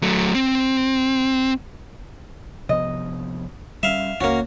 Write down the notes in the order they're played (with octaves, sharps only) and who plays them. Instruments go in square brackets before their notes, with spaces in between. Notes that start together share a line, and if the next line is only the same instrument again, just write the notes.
[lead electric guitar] F#3 A3
C4
[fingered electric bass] C3 F3 B3 [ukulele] D#5
[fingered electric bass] G3 C#4 [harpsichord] E5 F5
[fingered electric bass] C#2 [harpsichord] A#3 C#4 [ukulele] F#4